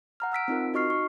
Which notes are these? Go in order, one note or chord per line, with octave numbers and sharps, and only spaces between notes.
F#5 A#5 F6
F#5 E6 B6 D7
C4 D#4 F4 A#4
D#4 F#4 D#5 C#6 F6 C7
C#6